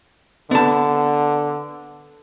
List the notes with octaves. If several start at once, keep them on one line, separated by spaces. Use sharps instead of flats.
D3 B3 A5